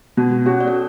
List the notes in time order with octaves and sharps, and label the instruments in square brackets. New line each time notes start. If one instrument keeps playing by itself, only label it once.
[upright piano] B2 [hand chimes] F#4
[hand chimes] F#4
[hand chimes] C#4 C#5 [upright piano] F#4
[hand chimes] D4 D5
A4